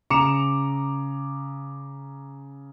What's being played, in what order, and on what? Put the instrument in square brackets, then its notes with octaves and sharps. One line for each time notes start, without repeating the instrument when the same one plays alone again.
[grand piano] C#3 A#5 D6 C#7 E7 F7